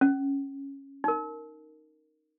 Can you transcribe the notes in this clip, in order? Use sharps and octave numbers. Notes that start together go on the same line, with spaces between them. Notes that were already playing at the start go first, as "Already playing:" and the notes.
C#4
D#4 A#4